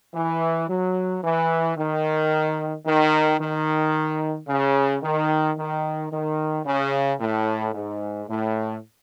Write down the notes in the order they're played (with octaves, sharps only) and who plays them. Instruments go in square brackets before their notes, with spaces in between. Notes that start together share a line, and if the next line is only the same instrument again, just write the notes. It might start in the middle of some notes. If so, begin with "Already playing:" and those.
[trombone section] E3
F#3
E3
D#3
D#3
D#3
C#3
D#3
D#3
D#3
C#3
A2
G#2
A2